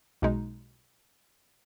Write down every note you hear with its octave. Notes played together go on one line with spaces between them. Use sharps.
B1 B2 G#3 D#4